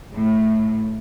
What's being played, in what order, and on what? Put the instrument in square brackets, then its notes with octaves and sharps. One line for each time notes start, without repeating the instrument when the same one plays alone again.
[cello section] A2